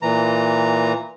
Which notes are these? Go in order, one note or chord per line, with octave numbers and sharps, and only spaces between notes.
A#2 E3 A#5